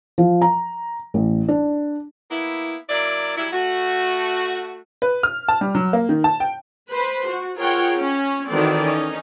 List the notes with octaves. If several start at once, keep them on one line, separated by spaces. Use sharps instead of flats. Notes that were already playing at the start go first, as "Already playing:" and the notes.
F3
A#5
A1
D4
A#3 B3 E4
F#3 A#3 E4 D5
F#3 G3 E4
A3 F#4
B4
F6
A5
G3
F#3
A#3
D#3
A5
G5
B4 C5
F#4
F4 G#4 A#4 C#5 F#5 G5
C#4
D#3 E3 C4 F#4 A4 D5
C#4 D#4